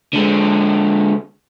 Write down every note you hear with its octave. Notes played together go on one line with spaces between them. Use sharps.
D3 G#3